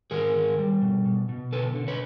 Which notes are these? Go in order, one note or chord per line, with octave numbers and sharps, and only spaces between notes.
D#3 G#4 A#4
D#3
G3
B2
B2
B2
D3 A4 B4
D3
B4 C#5